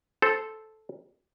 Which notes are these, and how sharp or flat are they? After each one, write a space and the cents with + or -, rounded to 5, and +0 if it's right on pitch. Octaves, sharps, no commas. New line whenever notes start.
A4 -10 C5 +0